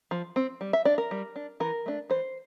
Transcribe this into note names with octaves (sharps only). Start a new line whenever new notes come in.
F3
C4
G3
E5
D4 D5
A#4
G3
D4
E3 A#4
A3 D4
E3 C5